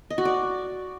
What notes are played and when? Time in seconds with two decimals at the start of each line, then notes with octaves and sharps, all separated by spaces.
0.10 D#5
0.18 F#4
0.25 D5